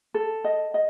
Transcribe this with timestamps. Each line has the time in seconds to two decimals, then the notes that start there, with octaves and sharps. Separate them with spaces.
0.14 A4
0.44 D#5
0.74 D#5